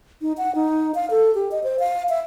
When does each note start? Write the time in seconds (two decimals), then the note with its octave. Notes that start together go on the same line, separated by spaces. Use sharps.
0.22 D#4
0.38 F#5
0.55 D#4
0.95 F5
1.10 A4
1.35 G4
1.52 D#5
1.64 C5
1.79 F5
2.09 E5